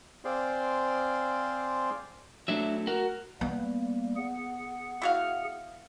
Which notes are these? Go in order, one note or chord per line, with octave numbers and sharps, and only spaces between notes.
C4 G#4 C5 D5 F5 C6
F#3 A3 D4 E5
F#4 A#4
G3 A#3 B3
G#4 F#5
E4 F#4 F5